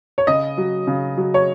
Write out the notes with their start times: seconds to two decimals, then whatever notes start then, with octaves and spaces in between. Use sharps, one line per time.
0.18 C#5
0.27 C#3 D#5
0.58 F#3
0.87 C#3
1.17 F#3
1.34 C#5